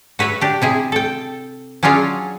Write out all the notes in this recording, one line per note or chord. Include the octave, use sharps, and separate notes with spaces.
F#4 B4 C#5 E5
D4 G4
C3 E4 G#4
A4 G5
F#3 C#4 D4 F4 G#4 C#5